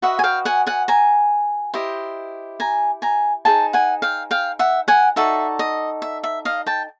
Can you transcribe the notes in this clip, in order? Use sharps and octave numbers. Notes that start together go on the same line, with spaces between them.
F#4 B4 D#5 E5 F#5
G#5
F5 G5
F#5 G#5
F#5 G#5
G#5 A#5
E4 G4 C5 D#5
G#5 A#5
G#5 A#5
D#4 G#4 C5 G5 A5
F#5 G#5
F5 G5
F5 G5
E5 F#5
F#5 G#5
D#4 F#4 A4 D5 E5
D#5
E5
E5
D#5 F5
G5 A5